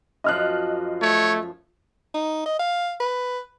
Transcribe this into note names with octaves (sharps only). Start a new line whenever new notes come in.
F#2 F3 D#5 F6 F#6
A3 C#5
D#4
D#5
F5
B4